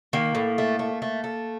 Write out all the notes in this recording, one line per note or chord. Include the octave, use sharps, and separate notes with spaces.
D#3 A#3
A2
A3
A3
A3
A3